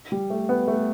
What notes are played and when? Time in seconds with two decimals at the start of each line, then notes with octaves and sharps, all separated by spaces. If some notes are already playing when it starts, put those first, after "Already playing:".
0.12 G3
0.30 A3
0.49 B3
0.68 A3